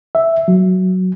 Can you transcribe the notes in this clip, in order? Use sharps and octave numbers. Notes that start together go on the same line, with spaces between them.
E5
F#3